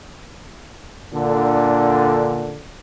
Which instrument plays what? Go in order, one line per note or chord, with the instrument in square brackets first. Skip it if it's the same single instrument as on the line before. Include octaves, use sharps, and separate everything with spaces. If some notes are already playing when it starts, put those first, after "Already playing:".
[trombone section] A#2 D3